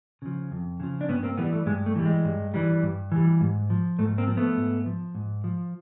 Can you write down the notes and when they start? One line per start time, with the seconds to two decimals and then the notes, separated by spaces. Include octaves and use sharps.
0.22 C#3 F3
0.51 F2
0.80 C#3 F3
1.01 D4
1.09 G2 B3 C#4
1.23 A#3 C4
1.37 E3 A3 B3
1.42 G3
1.53 A3
1.66 G2 G#3
1.86 A3
1.96 E3 G3
2.06 G#3
2.25 G2
2.54 E3 G3
2.83 G2
3.12 E3 G3
3.41 G#2
3.70 F3
3.99 G#2 A3
4.18 A#3 C4
4.27 F3
4.37 A3 B3
4.57 G#2
4.86 F3
5.15 G#2
5.44 F3